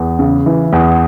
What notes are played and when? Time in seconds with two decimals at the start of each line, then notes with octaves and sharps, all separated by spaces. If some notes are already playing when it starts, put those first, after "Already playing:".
Already playing: E2
0.19 C#3
0.46 E3
0.73 E2